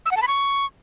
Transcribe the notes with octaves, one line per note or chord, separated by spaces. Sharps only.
E6
F#5
A5
B5
C#6